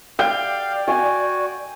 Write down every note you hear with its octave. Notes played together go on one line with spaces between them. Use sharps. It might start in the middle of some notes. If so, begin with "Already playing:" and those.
D5 F5 G5
F#4 G#5